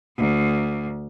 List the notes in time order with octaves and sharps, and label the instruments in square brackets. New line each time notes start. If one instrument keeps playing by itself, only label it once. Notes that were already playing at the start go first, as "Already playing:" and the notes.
[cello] D2